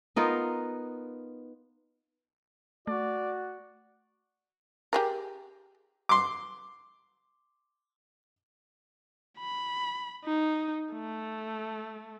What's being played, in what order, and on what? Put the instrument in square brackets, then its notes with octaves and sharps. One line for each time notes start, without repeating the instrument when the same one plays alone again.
[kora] B3 D#4 F4 A#4
[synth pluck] A3 [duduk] F#4 [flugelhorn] D5
[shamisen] G4 G#4 A#4
[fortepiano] C6 D6
[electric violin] B5
D#4
A3